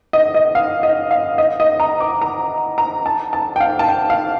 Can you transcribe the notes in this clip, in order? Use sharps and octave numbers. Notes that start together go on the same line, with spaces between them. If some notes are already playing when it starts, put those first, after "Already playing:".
D#5
D#5
F5
D#5
F5
D#5
D#5
A#5
D6
A#5
A#5
A5
A5
G5
F5
A5
G5
F5